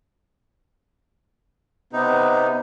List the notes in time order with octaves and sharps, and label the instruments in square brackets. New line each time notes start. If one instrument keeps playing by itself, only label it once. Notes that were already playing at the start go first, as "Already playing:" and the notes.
[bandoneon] C3 D#4 [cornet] B3